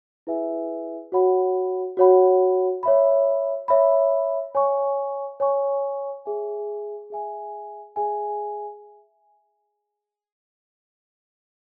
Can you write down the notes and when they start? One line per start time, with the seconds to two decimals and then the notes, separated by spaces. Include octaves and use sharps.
0.27 E4 G#4 B4 E5 G#5
1.12 F#4 C#5 F#5 B5
1.97 F#4 C#5 F#5 B5
2.83 C#5 E5 B5
3.68 C#5 E5 B5
4.55 C#5 G#5 C#6
5.40 C#5 G#5 C#6
6.25 G#4 E5 G#5
7.10 G#4 E5 G#5
7.96 G#4 E5 G#5